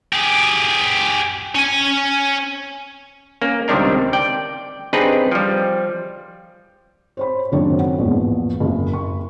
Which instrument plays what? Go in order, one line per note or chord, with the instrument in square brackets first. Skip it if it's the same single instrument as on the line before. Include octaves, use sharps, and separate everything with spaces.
[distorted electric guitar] G4 G#4
C#4 G#5
[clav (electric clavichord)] A#3 C#4
C#2 C3 D#3 G3 D4 A#4
D5 G5
C4 D4 D#4 G4 G#4 B4
F3 G3
[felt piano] C5 C#5 B5
F#1 D#3 F#3 C4 D4 C#5
F#5
A#1 E2 G#2
F#1
C#6